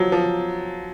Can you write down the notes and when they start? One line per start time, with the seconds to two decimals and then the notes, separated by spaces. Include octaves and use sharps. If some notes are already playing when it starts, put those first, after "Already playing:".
Already playing: F3 F#3
0.12 F3